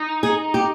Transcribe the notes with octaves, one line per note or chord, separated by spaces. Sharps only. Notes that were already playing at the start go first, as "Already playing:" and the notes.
Already playing: D#4
G#4
G4